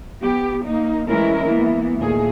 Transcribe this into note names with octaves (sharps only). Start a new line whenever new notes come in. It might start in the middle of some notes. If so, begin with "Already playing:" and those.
B3 G4
A#3 D#4
E3 G#3 A3 C#4 E4 A#4
E3 A#3 B3
D#2 A#2 A3 G#4